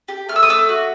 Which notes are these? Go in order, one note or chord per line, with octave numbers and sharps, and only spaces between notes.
G4
A3 F6
E6
D#6
A3 D6 E6
F#4